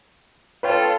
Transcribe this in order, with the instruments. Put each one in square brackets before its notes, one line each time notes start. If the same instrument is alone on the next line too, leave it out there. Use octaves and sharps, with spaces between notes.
[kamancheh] F4 A4 [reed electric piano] B4 C#5 G5